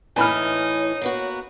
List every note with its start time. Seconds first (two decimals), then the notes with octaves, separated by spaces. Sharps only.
0.16 A2 E3 D#4 C#5 G#5 B5 F6
1.02 A#3 B3 F#4